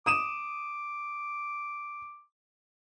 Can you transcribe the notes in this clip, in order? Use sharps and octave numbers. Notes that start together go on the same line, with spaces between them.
D6 D#6 D#7 E7